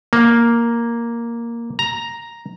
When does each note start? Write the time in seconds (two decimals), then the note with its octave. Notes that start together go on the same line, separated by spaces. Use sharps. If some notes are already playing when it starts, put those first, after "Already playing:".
0.13 A#3
1.79 A#5